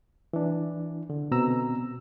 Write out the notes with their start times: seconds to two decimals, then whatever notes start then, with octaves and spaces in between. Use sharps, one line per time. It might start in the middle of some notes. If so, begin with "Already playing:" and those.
0.33 E3 D4
1.10 D3
1.31 B2 C4 A#5 E6